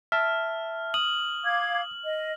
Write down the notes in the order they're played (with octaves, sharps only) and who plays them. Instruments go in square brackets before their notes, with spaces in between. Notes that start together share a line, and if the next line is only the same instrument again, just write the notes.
[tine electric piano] E5 A5 [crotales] F6
[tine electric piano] D#6 [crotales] F#7
[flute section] F5 D6 G#6
D#5